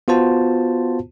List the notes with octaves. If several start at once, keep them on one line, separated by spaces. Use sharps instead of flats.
B3 F4 F#4 C5 A5